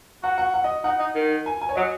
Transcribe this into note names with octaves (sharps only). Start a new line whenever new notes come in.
F#4 F#5
F#5
F#5
D#5
D#4 F#5
D#4
D#3
G#5
G#5
C#5
F#3 D#5